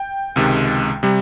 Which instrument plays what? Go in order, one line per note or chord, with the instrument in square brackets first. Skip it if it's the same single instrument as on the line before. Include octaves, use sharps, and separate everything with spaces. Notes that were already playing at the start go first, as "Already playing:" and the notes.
Already playing: [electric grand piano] G5
C#2 C3 D#3 G#3
C3 G3